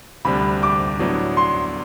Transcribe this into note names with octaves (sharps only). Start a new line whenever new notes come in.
D2 C3 G3 B5
D6
A2 F#3 B3 D4
C6